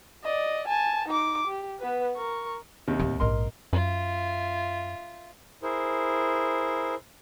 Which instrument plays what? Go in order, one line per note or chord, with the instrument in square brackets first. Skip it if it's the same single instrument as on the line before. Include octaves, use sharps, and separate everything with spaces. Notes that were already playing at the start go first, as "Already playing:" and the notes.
[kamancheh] D5 D#5
G#5 A5
D#4 D6
G4
B3 B4
A#4 C#6
[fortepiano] D#2 C3
[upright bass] D1 C4
[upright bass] A#1 G#2 [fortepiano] A#4 D#5 C6
[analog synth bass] F#2 [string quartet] F4 E5
[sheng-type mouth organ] E4 G#4 A#4 C5